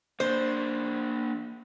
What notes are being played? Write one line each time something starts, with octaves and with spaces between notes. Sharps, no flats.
A#3 D4 C5